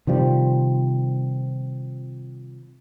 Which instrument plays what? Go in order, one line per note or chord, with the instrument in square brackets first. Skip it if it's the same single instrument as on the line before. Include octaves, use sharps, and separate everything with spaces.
[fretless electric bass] C3 D#3 F3 G3